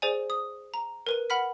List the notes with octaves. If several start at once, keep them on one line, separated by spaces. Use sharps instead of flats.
G#4 C5 D5 G#5
D#6
A#5
A#4 B4 D#7
F#5 B5 F6 B6